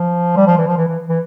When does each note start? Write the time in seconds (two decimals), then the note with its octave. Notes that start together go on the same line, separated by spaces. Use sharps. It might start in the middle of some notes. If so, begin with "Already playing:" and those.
Already playing: F3
0.37 G3
0.47 F3
0.58 E3
0.67 F3
0.77 E3
0.88 E3
1.09 E3